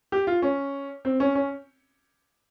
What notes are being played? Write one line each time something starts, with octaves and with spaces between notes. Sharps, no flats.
G4
F4
C#4
C4
C#4
C#4